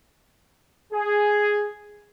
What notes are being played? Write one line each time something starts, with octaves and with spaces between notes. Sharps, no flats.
G#4